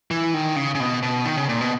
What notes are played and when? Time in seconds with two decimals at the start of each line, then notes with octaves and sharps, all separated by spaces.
0.11 E3
0.34 D#3
0.56 C#3
0.75 C#3
0.80 B2
1.02 B2
1.25 D#3
1.37 C#3
1.49 A#2
1.61 B2